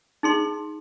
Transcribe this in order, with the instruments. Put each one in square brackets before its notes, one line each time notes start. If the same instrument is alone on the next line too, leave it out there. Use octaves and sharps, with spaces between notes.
[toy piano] D#4 G#4 C6